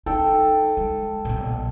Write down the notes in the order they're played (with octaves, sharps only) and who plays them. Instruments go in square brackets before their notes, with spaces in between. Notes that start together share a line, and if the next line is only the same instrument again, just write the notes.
[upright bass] D#4 [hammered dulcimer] A4 D5 G5
[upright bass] G#3
B1 A#2